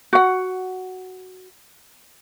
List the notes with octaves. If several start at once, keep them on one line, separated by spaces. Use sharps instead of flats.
F#4 F#5